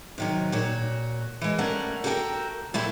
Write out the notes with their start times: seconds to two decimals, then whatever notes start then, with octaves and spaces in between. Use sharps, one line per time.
0.18 C3 D#3 F#3
0.52 A#2 F#4 C#5
1.41 E3 G#3
1.58 G3 A3 C#4 A#4 F#5
2.04 F#4 G4 A4 A#4 F#5 G5
2.74 A#2 A3 E4 G4